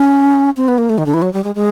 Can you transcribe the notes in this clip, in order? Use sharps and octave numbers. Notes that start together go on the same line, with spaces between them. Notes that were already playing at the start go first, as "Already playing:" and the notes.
Already playing: C#4
C4
B3
A#3
A3
D#3
D3
E3
F#3
G3
G#3
G#3